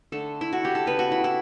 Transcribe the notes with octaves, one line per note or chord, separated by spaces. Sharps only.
D3 A3 A4
E4
F#4
G4
A4
C#3 G3 B3 B4
F#4
E4
E4